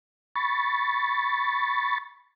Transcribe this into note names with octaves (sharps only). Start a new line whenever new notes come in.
B5 C#6 A6